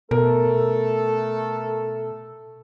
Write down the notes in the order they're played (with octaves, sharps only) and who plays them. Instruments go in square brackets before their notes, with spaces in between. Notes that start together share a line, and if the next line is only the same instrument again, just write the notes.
[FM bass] B2 [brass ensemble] A3 A4 [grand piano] A#4